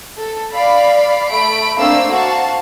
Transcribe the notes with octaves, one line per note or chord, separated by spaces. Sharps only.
A4
D5 F5 B5
A3 B5 D7
A3 A#3 C4 D4 F5 E6
F#4 C5 F5 A5